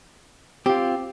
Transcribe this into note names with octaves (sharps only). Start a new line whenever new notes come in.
C4 F4 G4